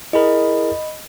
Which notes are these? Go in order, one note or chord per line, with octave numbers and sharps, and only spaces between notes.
E4 G#4 A#4 D#5 B5